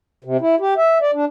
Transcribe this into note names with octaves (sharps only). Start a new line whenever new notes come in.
C3
E4
G4
E5
D5
D4